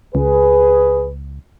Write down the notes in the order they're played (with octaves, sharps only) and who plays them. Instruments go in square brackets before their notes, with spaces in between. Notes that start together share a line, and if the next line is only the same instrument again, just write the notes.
[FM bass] C#2 [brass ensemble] G#4 B4